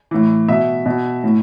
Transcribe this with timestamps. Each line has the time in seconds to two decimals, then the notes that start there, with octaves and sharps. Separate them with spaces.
0.11 A2 E3
0.49 B2 E5
0.86 B2
1.24 A2